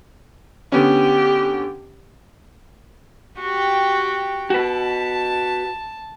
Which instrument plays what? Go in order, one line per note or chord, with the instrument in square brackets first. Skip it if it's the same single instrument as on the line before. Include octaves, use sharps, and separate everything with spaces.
[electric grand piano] D3 B3 C#4 [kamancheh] G4
[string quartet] F#4 G4 G5
[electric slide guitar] F#4 B4 [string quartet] A5